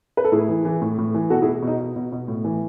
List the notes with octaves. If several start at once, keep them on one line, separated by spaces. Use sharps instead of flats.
B4
A4
A2 E4 G#4
E3
E3
A2
A2
E3
B2 F#4 A4
E4 G#4
B2
B2
D#4
B2
B2
B2
A2
E3